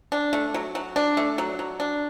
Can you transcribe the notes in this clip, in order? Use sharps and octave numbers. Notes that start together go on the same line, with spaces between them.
D4
A3
F#3
F#3
D4
A3
F#3
F#3
D4